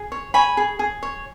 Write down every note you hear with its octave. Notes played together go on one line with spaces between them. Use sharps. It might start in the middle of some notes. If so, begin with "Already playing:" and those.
Already playing: G#4
C#5
C#5 G#5 B5
G#4
G#4
C#5